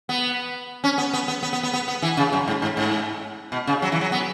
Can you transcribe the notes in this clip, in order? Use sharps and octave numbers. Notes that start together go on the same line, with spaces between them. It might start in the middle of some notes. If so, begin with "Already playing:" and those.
B3
C#4
B3
B3
B3
B3
B3
B3
B3
B3
E3
C#3
F#2
G#2
G#2
G#2
B2
C#3
F#3
E3
F#3
B3